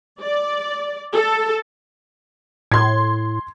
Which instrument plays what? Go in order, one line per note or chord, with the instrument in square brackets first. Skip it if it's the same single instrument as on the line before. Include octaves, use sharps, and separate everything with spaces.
[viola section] D5
A4
[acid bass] A2 [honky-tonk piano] C6 G#6